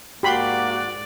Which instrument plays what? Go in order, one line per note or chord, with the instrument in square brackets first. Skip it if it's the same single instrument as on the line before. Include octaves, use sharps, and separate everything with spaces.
[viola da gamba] G#2 D5 [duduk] A#3 [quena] F#4 [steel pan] G4 B5 C6